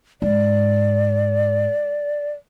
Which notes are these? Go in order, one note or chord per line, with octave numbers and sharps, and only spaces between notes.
G#2 D5